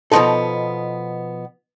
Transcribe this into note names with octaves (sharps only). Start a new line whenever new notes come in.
B2 F3 B3 C4 D#4 A4